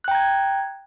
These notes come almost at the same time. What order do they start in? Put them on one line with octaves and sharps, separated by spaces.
F#6 G5 A#5 G#6